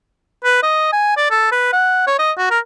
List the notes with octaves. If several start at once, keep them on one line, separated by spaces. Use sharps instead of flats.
B4
D#5
G#5
D5
A4
B4
F#5
C#5
D#5
F#4
A#4